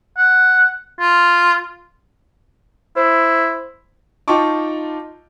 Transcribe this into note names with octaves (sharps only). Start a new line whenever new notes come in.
F#5
F4
E4 C5
D#4 F4 G5 A5 C#6 D6